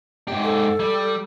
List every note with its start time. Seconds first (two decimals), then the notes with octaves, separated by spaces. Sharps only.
0.28 G#2 G4
0.43 A4
0.80 G3